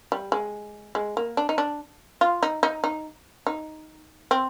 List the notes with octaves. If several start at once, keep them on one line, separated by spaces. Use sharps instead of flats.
G3
G#3
G#3
A#3
D4
D#4
D4
F4
D#4
D#4
D#4
D#4
C4